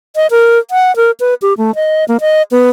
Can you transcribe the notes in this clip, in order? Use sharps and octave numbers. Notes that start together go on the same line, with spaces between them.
D#5
A#4
F#5
A#4
B4
G4
A3
D#5
A#3
D#5
B3